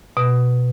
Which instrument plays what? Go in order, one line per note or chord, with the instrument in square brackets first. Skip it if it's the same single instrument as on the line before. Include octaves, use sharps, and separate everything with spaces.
[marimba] B2